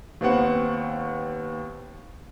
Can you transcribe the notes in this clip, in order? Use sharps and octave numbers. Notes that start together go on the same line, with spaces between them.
D#2 B3 C4 F#5 C#6